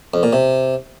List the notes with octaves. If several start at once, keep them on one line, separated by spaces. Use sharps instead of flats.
F2
A#2
C3